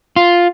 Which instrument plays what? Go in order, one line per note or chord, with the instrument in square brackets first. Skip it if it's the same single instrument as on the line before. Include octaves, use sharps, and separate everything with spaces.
[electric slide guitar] F4